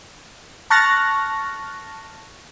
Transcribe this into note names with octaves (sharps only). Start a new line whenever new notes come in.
A5 C#6 F6 F#6 A6 A#6